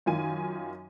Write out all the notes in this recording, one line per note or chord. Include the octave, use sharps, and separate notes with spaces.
F#2 D#3 F4 G#5 D#7